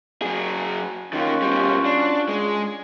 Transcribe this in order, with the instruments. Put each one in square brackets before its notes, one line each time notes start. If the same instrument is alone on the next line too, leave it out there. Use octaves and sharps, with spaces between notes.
[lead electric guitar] F#3 G#4
[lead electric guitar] D#3 A#3 [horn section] C#4 F4 F#4
[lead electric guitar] B2 G3
D4
G#3